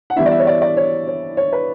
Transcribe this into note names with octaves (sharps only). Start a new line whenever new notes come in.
F#5
E3 G3 B3 E4 E5
D5
E5
C#5
D5
D5
C#5
C#5
C#5
B4